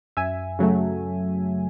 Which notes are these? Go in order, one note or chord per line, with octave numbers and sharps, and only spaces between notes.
F#2 E5 G#5
C#3 F#3 A3